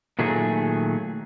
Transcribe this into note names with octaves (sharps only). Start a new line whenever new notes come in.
A#2 D#3 F#3 A3 G#4 G#5